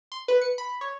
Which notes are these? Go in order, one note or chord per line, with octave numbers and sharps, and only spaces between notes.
C6
B4
C#7
B5
C#5